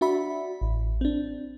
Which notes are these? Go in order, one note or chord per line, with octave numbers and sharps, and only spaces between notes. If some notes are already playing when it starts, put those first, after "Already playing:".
D4 F#4 E5 B5
A1
C4 D4